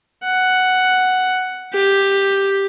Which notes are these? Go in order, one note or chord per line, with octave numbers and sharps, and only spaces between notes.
F#5
G4